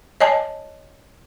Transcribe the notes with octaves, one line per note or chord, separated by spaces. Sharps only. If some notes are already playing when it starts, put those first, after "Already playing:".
C#5 D#5 G#5 A5